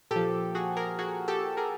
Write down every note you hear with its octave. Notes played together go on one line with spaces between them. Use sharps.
A#2 F3 G4 A4
F#4 G#4
G#4 A#4
F#4 G#4
G4 A4
G#4 A#4